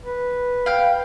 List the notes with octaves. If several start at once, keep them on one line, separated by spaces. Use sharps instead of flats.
B4
F5 G5